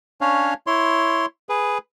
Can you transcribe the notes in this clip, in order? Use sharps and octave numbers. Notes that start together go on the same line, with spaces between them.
C#4 D4 C#5 F5
E4 C#5 C6
G#4 B4